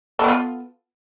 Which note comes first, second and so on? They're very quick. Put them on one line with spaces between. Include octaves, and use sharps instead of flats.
A4 B3 F4